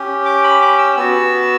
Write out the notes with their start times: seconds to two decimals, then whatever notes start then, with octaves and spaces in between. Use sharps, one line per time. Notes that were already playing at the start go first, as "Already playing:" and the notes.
Already playing: C#4 G4
0.26 D6
0.44 B5
0.62 D6
0.78 E6
0.97 B3 F#4 E6